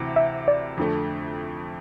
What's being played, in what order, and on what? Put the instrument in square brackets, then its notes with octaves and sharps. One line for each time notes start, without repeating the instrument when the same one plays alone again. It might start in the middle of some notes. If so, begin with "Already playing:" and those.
Already playing: [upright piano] D2 C3 E3
[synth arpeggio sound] E5
D5
[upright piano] F2 D3 A3